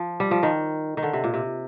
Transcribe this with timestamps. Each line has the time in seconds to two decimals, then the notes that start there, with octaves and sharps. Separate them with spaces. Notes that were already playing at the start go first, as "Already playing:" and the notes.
Already playing: F3
0.20 G3
0.31 F3
0.43 D#3
0.97 D#3
1.03 D3
1.13 C3
1.24 A#2
1.34 C3